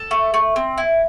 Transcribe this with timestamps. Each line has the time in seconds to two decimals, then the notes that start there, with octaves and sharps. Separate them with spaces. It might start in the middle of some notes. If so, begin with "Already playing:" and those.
Already playing: A4
0.11 A3
0.34 A3
0.56 C4
0.78 E4